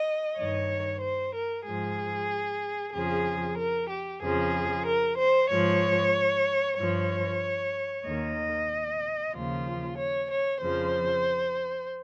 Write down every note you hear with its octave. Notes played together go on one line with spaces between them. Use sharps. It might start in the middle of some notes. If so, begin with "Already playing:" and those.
Already playing: D#5
G2 D#3 C#5
C5
A#4
G#2 F3 G#4
F2 C#3 F3 G#4
A#4
G4
F2 C#3 F3 G#4
A#4
C5
G#2 F3 C#5
G2 F3 C#5
D#2 D#3 D#5
D#2 C#3 F3 F4
C#5
C#5
F2 C#3 F3 C5